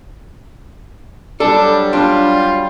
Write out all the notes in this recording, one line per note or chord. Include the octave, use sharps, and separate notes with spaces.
F#3 G3 D4 A4
D4 F4